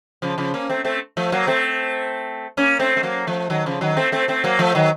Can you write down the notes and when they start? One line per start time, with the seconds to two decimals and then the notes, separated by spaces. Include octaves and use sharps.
0.22 C#3 F3
0.38 C#3 F3
0.54 A#3 C#4
0.69 A3 C4
0.84 A3 C4
1.17 F3 A3
1.32 F#3 A#3
1.47 A3 C4
2.57 A#3 C#4
2.79 A3 C4
2.97 A3
3.03 F#3 A#3
3.27 F3 A3
3.50 D#3 F#3
3.66 C#3 F3
3.81 D#3 F#3
3.97 A3 C4
4.12 A3 C4
4.28 A3 C4
4.44 F#3 A#3
4.59 F3 A3
4.75 D#3 F#3